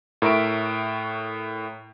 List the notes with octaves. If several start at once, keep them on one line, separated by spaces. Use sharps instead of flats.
A2 A#4 E5 C#6 D7